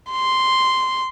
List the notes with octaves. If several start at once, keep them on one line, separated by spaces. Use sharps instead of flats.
C6